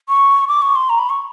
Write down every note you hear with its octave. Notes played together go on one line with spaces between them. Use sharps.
C#6
D6
C#6
C6
A#5
B5
C#6